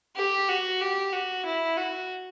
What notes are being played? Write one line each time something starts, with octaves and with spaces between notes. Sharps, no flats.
G4
F#4
G4
F#4
E4
F#4